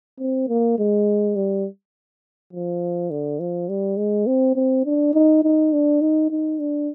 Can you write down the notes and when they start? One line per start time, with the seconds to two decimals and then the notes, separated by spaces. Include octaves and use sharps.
0.19 C4
0.48 A#3
0.78 G#3
1.36 G3
2.53 F3
3.10 D3
3.40 F3
3.69 G3
3.97 G#3
4.27 C4
4.56 C4
4.85 D4
5.14 D#4
5.43 D#4
5.73 D4
6.01 D#4
6.30 D#4
6.59 D4